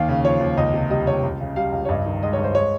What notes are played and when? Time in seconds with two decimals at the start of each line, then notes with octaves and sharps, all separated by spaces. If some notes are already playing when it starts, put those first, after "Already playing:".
Already playing: D#2 F5
0.08 C#3
0.24 F3 C#5
0.41 D#2
0.57 C#2 D#5
0.74 C3
0.90 G3 D#5
1.07 C#2 C#5
1.23 C#2
1.40 C#3
1.56 G3 F5
1.72 C#2
1.85 C#5
1.89 G2 D#5
2.06 D#3
2.22 G#3 D#5
2.33 C#5
2.39 G2
2.44 C5
2.55 G#3 C#5